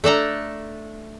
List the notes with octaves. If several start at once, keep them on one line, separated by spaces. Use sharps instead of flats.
A3 D4 A4 A#5